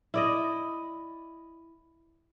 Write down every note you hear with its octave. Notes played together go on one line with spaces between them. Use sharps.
E4 D5 D#5